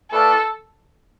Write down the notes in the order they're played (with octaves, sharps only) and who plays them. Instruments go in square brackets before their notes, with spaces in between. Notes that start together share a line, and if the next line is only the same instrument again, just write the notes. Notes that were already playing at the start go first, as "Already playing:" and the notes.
[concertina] A3 E4 B4 D5 F5 [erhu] A4